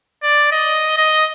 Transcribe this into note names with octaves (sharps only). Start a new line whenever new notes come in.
D5
D#5
D#5